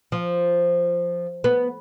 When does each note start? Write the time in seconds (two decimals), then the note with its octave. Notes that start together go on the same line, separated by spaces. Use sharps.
0.12 F3
1.44 B3